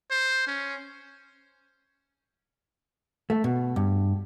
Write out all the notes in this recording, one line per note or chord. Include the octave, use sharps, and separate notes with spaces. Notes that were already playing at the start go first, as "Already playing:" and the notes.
C5
C#4
A3
B2
G2